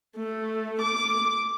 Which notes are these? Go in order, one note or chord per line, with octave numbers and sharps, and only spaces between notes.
A3
D6